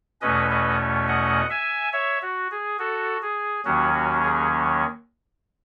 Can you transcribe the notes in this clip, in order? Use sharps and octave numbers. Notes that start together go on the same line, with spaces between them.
E2 B2 A3 C#4 B4 D#5
B4 D#5
D#5 F#5
E5 G#5
C#5 E5
F#4
G#4
F#4 A4
G#4
D#2 D#3 F#3 C#4 F#4
F#4
G#4